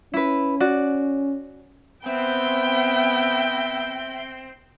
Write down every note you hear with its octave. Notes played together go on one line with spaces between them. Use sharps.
C#4 E4 B4
F#4 D5
B3 C4 E5 G5